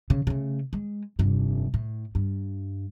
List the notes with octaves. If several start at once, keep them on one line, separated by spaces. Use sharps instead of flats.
C#3
C#3 A3
G#3
F1 G2
A2
G2